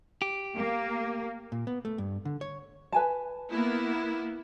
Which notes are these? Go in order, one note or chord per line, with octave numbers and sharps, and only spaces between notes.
G4
A#3
A#2
B3
A3
G2
D3
C#5
B4 G#5 A5
A#3 B3 E4